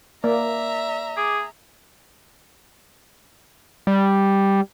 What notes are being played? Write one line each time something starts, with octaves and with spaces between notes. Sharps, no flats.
A#3 D5 E5 A#5
G#4 D6
G3